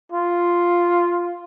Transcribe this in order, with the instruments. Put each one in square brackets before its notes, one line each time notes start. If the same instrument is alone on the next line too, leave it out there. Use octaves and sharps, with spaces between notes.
[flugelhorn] F4